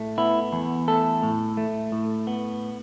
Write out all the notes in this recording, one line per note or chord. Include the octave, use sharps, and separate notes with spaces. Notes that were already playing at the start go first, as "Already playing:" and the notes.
Already playing: A2 A3
B3 E4
E2
A3 A4
A2
A3
A2
B3